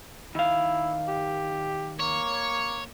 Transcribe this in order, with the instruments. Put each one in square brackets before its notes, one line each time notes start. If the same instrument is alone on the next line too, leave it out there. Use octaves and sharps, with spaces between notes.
[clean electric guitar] D#3 F5 [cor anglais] E4
[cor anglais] G4
[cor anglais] A#3 [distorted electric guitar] C#5